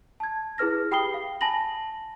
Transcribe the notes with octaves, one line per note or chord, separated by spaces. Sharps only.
A5 G#6
E4 G#4 B4 F6 A#6
G4 G5 B5 D#6 C7 G7
F5
G#5 A5 B5 A#6 F#7